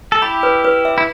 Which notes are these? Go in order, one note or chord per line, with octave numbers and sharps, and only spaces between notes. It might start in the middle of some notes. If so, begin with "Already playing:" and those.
A4
E4 G4 B5
B4
B4
E5
E4